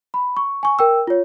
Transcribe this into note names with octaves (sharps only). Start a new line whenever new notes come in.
B5
C#6
G#5 C#6
A#4 G5 E6
F4 C#5